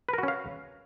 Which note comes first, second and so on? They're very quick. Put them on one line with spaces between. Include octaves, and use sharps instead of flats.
B4 A#4 F#4 C#4 F5